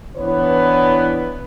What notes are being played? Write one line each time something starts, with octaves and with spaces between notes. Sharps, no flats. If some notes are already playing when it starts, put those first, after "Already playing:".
E3 B3 D4 E4 B4 C#5